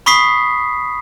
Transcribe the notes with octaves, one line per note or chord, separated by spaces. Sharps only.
B5 C#6 D#6 B6 C7